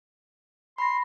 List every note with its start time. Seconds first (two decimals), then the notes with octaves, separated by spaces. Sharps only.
0.78 B5 C6 A#6